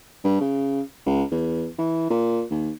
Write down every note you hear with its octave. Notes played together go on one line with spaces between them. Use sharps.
G2
C#3
C#2
E2
E3
A#2
D#2